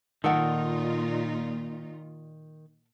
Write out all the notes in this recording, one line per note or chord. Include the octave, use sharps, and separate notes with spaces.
A#2 D#3 D#4 F4 A4 A#4 F#5